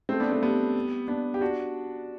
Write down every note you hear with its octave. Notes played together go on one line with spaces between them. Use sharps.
A3 C4
B3 D4
A3 C4
G3 B3
B3 D4
G4
D4 F#4